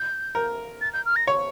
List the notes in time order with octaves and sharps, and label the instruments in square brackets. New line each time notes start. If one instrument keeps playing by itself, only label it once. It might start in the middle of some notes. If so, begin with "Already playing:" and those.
Already playing: [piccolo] G6
[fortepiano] A#4
[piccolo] A6
G6
F6
A#6
[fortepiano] C#5